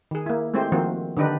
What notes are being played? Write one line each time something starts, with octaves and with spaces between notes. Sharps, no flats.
D#3 G#4
A#3 E4
G#3 A3 C4 E4 G4 C5
D#3 F3 A#3 C4 F#4 C5
D3 D#3 D4 D#4 G4 B4